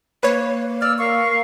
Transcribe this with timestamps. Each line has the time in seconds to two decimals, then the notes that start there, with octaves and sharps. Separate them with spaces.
0.23 A#3 B4 C#5
0.82 D5 E6 F6
0.97 A#4 F5 C#6